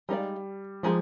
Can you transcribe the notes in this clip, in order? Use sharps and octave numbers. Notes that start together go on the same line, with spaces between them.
G3 G#3 D#4 A#4 D5 F5
F3 G#3 D#4 G#4